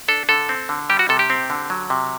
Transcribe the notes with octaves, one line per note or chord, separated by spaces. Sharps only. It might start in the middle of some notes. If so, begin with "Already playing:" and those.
D4 A4
D3 A4
C4
D3
G3 G4
F#4
C3 A4
G4
C4
D3
F#3
C3